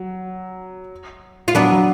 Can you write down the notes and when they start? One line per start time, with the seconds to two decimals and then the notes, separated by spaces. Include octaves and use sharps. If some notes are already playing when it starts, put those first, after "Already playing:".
Already playing: F#3
1.48 F4
1.55 F#3 B3 D4
1.71 F#3